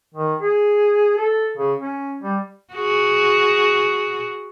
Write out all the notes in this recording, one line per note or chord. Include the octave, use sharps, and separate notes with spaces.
D#3
G#4
A4
C#3
C#4
G3
F#4 G#4